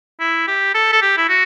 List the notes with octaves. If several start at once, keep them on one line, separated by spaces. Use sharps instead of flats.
E4
G4
A4
A4
G4
E4
F#4